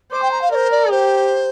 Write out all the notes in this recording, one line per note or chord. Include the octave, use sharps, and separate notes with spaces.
C5 D6
G5
A#5
F5
A#4 C5 D5
D5
G4 C5